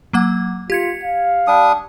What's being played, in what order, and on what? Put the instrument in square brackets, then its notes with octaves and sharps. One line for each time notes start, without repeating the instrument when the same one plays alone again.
[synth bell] F#3 A#3 F#5
[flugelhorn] F4 [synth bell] G4 G#6 C#7
[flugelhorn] F5
[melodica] G3 D4 D#6